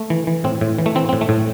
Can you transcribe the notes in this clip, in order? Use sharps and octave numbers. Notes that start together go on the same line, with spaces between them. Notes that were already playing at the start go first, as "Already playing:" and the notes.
Already playing: A3
E3
E3
A2 C4
A2
E3
A3
E3 C4
A2 C4
A3
A2